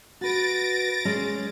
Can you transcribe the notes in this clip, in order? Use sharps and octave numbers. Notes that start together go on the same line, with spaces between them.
F#4 B4 A6 A#6 D7
G#3 C#4